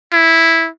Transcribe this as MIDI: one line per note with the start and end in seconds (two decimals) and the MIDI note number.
0.13 0.68 64